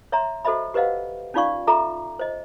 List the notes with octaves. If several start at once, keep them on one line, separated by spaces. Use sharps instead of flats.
C#5 E5 A#5 C6
F#4 A4 C5 D#5 E5 B5
G4 B4 C5 D#5 F5 F#5
C#4 D#4 F4 D5 F5 C#6
F4 A4 E5 A#5 D6
C5 D#5